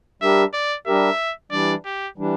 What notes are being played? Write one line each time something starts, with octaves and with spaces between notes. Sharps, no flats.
G3 D4 G4 A#4 E5
D5
G3 D4 G4 A#4 E5
E3 G3 D4 D5
G4
E3 G3 D4